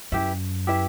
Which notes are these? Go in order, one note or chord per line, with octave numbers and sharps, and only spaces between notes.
F#2 E4 G4 B4 E5
E4 G4 B4 E5